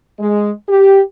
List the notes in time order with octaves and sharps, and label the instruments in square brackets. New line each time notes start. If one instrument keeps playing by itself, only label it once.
[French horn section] G#3
G4